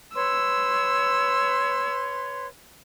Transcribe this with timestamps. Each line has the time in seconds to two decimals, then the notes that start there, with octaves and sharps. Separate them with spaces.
0.14 B4 C#5 C6 E6